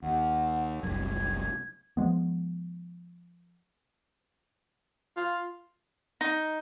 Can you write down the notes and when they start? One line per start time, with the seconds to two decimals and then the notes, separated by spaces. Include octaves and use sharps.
0.02 D#2 F#5
0.83 F#1 C2 F#2 G#6
1.97 F3 G#3 B3
5.17 F4
6.21 D#4